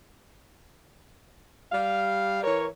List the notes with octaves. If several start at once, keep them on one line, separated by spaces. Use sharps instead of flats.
G3 F5
E3 A#4 C#5